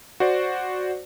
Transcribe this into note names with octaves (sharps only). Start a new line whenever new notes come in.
F#4 C5 D5